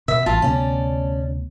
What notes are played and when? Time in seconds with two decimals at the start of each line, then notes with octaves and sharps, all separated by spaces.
0.08 B2 E5
0.26 A1 F4 A5
0.42 D2 C3 B3 C#4 D5